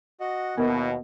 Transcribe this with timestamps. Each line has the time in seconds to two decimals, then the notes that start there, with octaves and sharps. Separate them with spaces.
0.20 F#4 D#5 F#5
0.57 D#2 B2 B3 E4 A#4